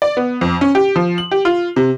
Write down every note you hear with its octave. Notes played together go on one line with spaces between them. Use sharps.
D5
B3
F2
C#4
G4
F3
F#7
G4
F4
C3